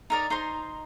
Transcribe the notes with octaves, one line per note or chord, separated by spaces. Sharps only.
D#4 A#4 D5
D#4 C5 A#5 C6